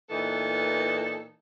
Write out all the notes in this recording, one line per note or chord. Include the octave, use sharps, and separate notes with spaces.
A#2 E3 B3 D#4 A4